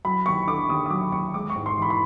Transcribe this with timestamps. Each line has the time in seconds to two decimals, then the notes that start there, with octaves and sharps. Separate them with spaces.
0.05 F#3 B5
0.26 D#2 C#6
0.47 D3 D6
0.69 D#2 D#6
0.86 D#6
0.90 F#3 D6
1.12 D#2 C#6
1.34 G#3 D6
1.50 C#6
1.56 G#2
1.66 C6
1.77 E3 B5
1.90 B5